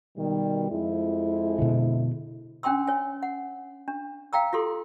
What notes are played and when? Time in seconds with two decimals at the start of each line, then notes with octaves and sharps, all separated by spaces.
0.17 B2 D#3 G3
0.71 F2 G#3 E4
1.59 B2 D3
2.63 C#4 D4 G5 G#5 C6 E6
2.87 C#5 G#5
3.23 F#5
3.88 D4
4.33 F5 G5 A#5 E6
4.53 F4 G4 A4 C6